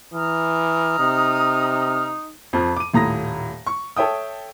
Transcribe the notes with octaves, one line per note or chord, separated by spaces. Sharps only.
E3 A#5 D#6 F6
C3 D#4
F2 F3
D6 D#7
D#1 A2 A#5 D#6 A#6
C#6
A4 C#5 E5 G5 D#6